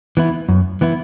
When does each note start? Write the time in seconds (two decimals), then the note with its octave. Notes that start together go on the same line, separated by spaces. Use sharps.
0.17 E3 B3 E4
0.49 F#2
0.81 E3 B3 E4